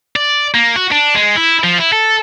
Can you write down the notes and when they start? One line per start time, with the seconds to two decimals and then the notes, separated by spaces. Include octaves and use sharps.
0.16 D5
0.55 A#3
0.76 F#4
0.92 D4
1.15 G#3
1.37 E4
1.64 F3
1.78 E4
1.93 A4